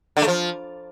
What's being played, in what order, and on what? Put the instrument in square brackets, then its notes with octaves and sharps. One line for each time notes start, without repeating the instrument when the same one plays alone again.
[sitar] D3
A3
F3